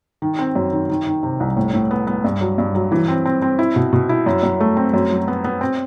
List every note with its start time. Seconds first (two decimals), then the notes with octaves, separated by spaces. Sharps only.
0.22 D#3
0.39 C4
0.55 F#2
0.73 D#3
0.90 D#3
1.07 D#3
1.23 C3
1.40 C2
1.57 A2
1.74 A2
1.91 B3
2.07 B3
2.24 G2
2.41 F#3
2.58 G2
2.75 F#3
2.92 E3
3.08 C4
3.25 C4
3.42 C4
3.59 E4
3.76 B2
3.93 B2
4.09 E4
4.26 F#2
4.43 F#2
4.61 A3
4.77 C4
4.94 F#2
5.11 F#3
5.28 B3
5.44 B3
5.61 C4